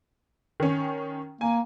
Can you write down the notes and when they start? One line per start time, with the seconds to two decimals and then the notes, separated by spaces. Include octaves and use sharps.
0.60 D#3 C#4
1.41 A#3 G#5